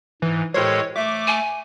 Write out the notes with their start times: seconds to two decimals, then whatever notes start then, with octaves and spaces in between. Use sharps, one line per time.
0.22 G#2 E3
0.54 A2 G#3 G4 A4 A#4 C5 C#5
0.96 A3 E5 D6
1.27 G#5